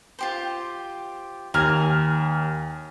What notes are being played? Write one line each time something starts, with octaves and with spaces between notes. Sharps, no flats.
F4 G4 C5
D#2 G#5 A#5 F6